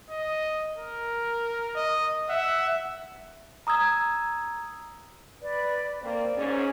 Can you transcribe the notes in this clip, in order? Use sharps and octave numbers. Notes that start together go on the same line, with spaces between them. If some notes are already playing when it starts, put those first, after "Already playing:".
D#5
A#4
D#5
E5 F#5
A#5 D#6 E6 G#6
B4 D5
A#3 C4 D5
G#2 C#4